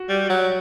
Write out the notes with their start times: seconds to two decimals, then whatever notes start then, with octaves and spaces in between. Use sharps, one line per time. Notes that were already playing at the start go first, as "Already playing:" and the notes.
Already playing: F#4
0.09 G3
0.30 F#3